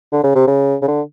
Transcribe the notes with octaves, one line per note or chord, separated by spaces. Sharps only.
D3
C#3
C3
C#3
C#3
D3